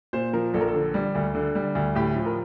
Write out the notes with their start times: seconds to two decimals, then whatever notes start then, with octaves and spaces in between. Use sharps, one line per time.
0.13 A#2 C5
0.33 F3 A#4
0.54 A#1 A4
0.61 A#4
0.68 A4
0.74 D3
0.94 G3
1.15 D2
1.35 D3
1.55 G3
1.75 D2
1.95 A2 G4
2.16 F3
2.26 A#4